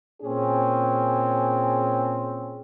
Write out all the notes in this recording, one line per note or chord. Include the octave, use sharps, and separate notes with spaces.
A#2 C4 C#4 G#4